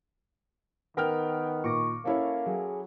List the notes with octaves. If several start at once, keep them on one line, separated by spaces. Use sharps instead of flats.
D#3 B3 A#4 G5 F6
A#2 C#6 D6 A#6
A#3 C#4 E4 A4 C#5
F#3 G#4